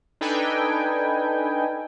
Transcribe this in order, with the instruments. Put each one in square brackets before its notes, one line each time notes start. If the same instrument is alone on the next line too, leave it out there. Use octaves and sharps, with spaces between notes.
[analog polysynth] D4 D#4 A4 B4 G5 G#5